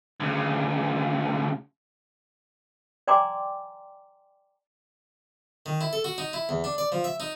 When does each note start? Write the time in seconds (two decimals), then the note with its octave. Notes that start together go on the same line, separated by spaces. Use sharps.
0.20 D2 C#3
3.08 D5 G5 G#5 A#5 C6 D6
5.66 D#3
5.81 E4
5.93 A4
6.04 F#4
6.18 D#4
6.33 E4
6.49 E2
6.64 D4
6.78 D5
6.92 F3
7.04 E5
7.20 D#4